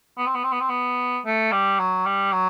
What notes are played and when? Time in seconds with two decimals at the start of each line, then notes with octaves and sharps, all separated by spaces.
0.18 B3
0.26 C4
0.34 B3
0.44 C4
0.52 B3
0.60 C4
0.69 B3
1.25 A3
1.52 G3
1.79 F#3
2.06 G3
2.33 F#3